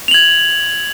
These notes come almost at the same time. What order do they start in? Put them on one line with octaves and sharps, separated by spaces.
F7 F#7 G#6